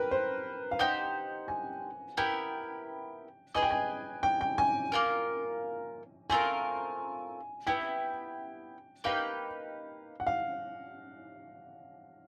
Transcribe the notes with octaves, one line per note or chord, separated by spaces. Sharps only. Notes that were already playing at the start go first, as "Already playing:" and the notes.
Already playing: G4 A#4 B4
C5
F5
D#4 G4 C5 F#5
G#5
B3 E4 G4 A#4 G5
G#4 B4 D#5 G#5
G5
G#5
G5
G5
G#5
A#3 C#4 F4 A#4
A3 C4 F4 A#4 G#5
B3 E4 G4 G5
A#3 D#4 G4 B4 F5
F#5
F5